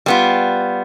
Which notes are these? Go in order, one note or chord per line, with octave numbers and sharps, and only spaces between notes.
G3 B3 F4